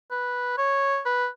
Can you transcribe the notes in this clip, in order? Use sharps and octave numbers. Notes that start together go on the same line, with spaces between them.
B4
C#5
B4